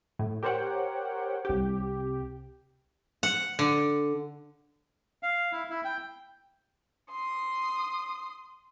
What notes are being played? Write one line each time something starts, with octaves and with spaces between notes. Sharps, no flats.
A2
G4 A#4 C5 C#5 F#5 G5
C2 G4
F#5
D3
F5
E4
E4
G5
C6 D#6